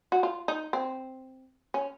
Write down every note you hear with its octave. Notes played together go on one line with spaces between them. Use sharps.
F#4
F4
D#4
C4
C#4